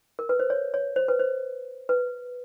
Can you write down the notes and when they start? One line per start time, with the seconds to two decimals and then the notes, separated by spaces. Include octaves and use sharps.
0.19 A#4
0.29 B4
0.40 C5
0.50 C#5
0.74 C#5
0.96 C5
1.08 B4
1.19 C5
1.89 B4